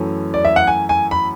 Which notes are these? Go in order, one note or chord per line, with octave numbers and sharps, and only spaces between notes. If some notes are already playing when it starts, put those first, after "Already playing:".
Already playing: F#2 E3 A3 C#4
D5
E5
F#5
G#5
G#5
B5